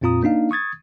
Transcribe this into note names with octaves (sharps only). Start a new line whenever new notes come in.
F2 A#2 C4 F4 A#5 D#6
A#3 D4 D#4 F5
C#6 D#6 G#6 A6